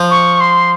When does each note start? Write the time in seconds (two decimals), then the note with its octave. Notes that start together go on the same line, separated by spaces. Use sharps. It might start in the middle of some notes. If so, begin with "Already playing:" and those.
Already playing: F3
0.11 C#6
0.40 C6